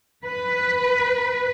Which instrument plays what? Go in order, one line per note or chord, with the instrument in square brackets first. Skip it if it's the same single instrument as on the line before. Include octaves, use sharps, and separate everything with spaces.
[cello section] B4